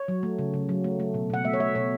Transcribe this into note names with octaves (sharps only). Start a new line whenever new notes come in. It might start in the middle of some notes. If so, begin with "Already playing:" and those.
Already playing: C#5
F#3
A3
C#3
C#3
F#3
A3
A3
B2
B2 F#5
A3 E5
C#5
A3 E5
B2 C#5